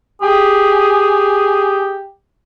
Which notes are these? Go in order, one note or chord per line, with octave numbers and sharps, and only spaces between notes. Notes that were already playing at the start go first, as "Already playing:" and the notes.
G4 G#4